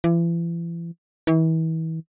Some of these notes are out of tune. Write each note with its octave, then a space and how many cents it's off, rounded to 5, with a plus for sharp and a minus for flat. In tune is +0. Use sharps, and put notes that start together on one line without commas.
E3 +40
E3 -35